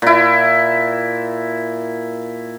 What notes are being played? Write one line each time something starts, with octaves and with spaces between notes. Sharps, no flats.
A#2 E4